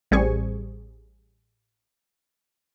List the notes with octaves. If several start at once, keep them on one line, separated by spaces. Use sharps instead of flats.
A1 G3 C4 G#4 G#5 C#6